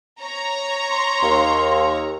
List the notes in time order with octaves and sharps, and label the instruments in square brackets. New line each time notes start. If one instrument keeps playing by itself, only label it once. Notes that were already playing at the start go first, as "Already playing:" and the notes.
[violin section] C#5 A#5
[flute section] C6
[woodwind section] D#2